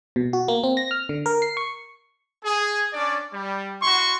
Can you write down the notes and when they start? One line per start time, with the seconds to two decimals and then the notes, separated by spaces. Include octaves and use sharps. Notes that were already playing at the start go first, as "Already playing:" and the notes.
0.16 B2
0.33 F#4
0.48 A#3
0.64 C4
0.77 A#6
0.91 F6
1.09 D3
1.26 A#4
1.42 C7
1.57 C#6
2.44 G#4
2.93 C#4 D4 D5
3.33 G3
3.82 E4 F#4 C6 C#6